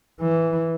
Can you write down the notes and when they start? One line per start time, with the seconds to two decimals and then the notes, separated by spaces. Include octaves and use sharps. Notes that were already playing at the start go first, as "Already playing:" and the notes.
0.20 E3